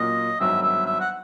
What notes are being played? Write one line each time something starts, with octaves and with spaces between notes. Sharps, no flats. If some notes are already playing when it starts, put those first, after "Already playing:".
Already playing: A#2 F#3 A#3 C#4 D#5
G#1 G2 D#3 F#3 B3 E5
E5
E5
F#5